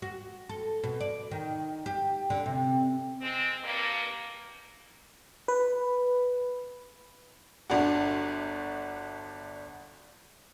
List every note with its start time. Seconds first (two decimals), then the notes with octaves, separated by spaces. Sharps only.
0.02 F#4
0.49 A4
0.84 B2
1.00 D5
1.31 D#3
1.86 G4
2.30 D3
2.46 C3
3.21 G#3 C4
3.63 G2 A#3
5.48 B4
7.70 G1 D4 F#4